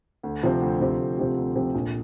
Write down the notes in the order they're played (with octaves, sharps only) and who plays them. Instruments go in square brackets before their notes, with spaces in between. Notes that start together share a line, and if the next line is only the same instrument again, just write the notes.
[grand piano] D2
C3 F3 C4 G4
D2
C3 F3 C4 G4
D2
C3 F3 C4 G4
D2
C3 F3 C4 G4
A#1